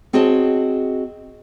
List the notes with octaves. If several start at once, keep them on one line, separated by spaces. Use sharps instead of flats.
C4 F#4 G#4 C#5 D#5 A5